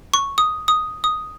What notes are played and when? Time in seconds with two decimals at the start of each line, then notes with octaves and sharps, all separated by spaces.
0.14 C#6
0.38 D#6
0.68 D#6
1.04 D#6